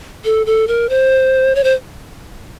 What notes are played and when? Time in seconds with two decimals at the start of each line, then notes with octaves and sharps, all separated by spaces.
0.25 A4
0.46 A4
0.68 A#4
0.89 C5
1.55 C#5
1.64 C5